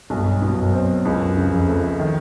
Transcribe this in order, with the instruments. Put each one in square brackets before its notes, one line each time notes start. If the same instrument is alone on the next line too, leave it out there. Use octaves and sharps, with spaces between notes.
[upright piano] B1 [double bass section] G2
[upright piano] B2
[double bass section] F#2
[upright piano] C4
[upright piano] C#2 [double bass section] F#2
[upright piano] C#3
[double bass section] F2
[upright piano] A3
D#3